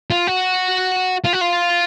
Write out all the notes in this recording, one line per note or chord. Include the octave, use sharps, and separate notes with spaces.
F4
F#4
F4
F#4
F4